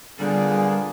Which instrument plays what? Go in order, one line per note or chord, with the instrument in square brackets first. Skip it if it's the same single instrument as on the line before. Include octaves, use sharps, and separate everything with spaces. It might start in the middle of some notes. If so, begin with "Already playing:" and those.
[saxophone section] A#2 D3 [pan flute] G3 [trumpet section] A#3 B3 G#4